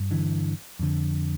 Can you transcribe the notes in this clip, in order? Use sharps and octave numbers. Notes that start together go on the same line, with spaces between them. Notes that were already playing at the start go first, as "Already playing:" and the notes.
Already playing: G2
D3 E3
F2 D3